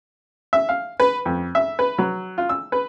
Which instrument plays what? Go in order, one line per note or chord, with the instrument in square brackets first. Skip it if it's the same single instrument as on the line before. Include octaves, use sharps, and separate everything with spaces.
[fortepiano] E5
F5
B4
F2
E5
B4
F#3
F4
E6
B4